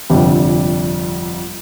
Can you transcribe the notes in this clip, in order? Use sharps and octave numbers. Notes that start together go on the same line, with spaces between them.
G1 F2 C3 G3 D4